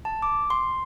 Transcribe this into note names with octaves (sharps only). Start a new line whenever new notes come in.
A5
D6
C6